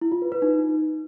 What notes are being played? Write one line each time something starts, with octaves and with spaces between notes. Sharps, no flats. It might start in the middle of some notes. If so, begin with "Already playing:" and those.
E4
F4
B4
B4
D#4